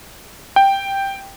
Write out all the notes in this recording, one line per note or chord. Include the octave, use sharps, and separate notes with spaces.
G5